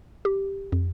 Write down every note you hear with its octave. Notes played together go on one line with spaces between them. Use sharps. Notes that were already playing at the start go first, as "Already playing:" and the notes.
G4
F2